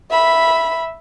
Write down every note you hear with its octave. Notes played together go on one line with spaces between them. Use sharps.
E5 B5